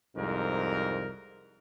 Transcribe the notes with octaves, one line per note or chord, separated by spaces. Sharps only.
C2 F2 G#2 A#4